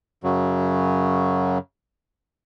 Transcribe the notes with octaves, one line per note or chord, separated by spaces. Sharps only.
F#2 C#3 F#3